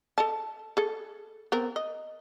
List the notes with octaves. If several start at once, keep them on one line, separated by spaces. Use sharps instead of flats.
A4 D#5 A5
G#4 A4
B3 C4 A#4
D#5